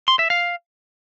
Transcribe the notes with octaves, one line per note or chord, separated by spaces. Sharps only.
C6
E5
F5